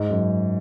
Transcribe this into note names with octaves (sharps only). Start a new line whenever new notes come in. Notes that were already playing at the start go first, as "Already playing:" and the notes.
Already playing: G#2
F#2